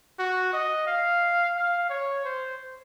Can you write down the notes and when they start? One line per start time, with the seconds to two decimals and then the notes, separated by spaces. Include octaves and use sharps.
0.19 F#4
0.53 D#5
0.87 F5
1.56 F5
1.90 C#5
2.25 C5